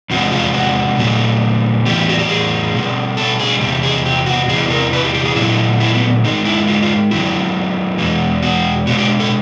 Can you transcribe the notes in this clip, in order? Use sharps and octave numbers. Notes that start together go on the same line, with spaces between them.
E2 C3 F3 G#3 F#4
F4
F#4
A#2 F#3 A3
A2 E3 G3 G4
F#4
G4
G#4
B2 G3
A4
G#4
E2 C3 G4
G#4
G4
F#4
E2 C3 E3 G#4
A#4
B4
G4
G4
G#4
A#2 F#3 A3 E4
E4
B3
G#2 D#3 G#3 D#4
E4
F4
F4
F#2 D#3 F#3 E4
E2 B2 G#3
F#4
B2 G#3 F#4
G4
A4